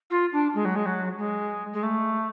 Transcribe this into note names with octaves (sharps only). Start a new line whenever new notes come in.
F4
D4
G#3
F#3
G#3
F#3
G#3
G#3
A3